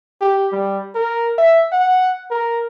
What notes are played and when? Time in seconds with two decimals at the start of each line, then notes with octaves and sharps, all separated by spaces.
0.21 G4
0.52 G3
0.95 A#4
1.38 E5
1.72 F#5
2.31 A#4